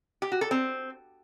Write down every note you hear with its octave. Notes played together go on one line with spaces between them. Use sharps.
G4
F#4
A4
C4